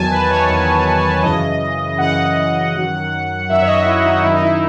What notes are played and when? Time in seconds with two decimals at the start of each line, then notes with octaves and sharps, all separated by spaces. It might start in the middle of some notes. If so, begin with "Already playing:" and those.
Already playing: E2 D#3 F#3 G#5 A5
0.11 B4
0.30 C#5
0.49 E2 D#3 F#3
1.23 F#2 C#3 E3 D#5
1.98 F#2 C#3 E3 F#5
2.74 F#2 D#3 F#3
3.49 F#2 D#3 F#3 E5
3.62 C#5
3.67 D#5
3.86 E4
4.05 D#4
4.24 F#2 D#3 F#3 E4
4.32 D#4
4.42 E4